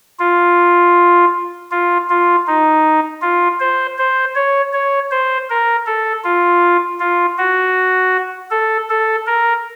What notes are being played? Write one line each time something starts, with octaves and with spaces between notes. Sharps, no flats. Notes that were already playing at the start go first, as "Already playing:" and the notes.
F4
F4
F4
D#4
F4
C5
C5
C#5
C#5
C5
A#4
A4
F4
F4
F#4
A4
A4
A#4